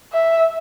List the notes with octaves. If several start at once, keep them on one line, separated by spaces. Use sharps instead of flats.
E5